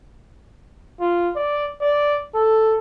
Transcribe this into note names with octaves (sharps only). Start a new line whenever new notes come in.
F4
D5
D5
A4